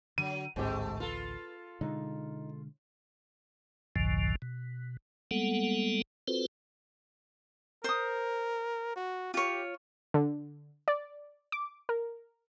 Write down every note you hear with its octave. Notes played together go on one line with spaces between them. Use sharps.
D3 F#3 D#7
A1 D2 G#2 G#3 A3 C4 G4
F4 A4 B4
B2 D3 G#3 D#4
G#1 C#2 F#2 A2 D3 F3
B2
G3 G#3 A#3 B3 A4 F#5
C4 F4 F#4 A4 B4 C5
A#4 C5 D#6
F#4
F4 G4 C#5
D3
D5
D6
A#4